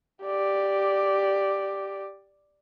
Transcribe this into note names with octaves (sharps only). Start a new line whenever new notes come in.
G4 D5